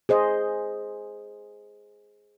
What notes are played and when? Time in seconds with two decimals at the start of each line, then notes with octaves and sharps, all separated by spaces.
0.09 G#4 C5 D#5